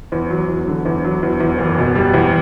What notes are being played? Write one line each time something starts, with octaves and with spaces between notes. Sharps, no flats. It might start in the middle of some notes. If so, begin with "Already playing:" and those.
E2
F#3
E2
D3
E2
F#3
E2
E2
F#1
B2
G3
E2